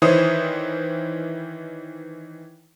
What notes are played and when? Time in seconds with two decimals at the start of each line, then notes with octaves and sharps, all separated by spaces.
0.02 D#3 E3 E4 C5 C#5 D#6